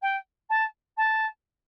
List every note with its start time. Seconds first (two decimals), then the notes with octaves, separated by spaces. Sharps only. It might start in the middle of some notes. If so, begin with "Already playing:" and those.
0.02 G5
0.49 A5
0.97 A5